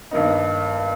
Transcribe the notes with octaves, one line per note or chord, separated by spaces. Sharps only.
G1 G2 D#3 A#3 D#4